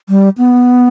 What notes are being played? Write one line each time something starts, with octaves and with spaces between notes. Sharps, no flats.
G3
B3